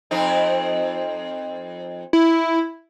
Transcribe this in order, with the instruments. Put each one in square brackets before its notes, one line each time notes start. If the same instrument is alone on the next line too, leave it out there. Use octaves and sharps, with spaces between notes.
[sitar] F2 C4 D#4
[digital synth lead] E4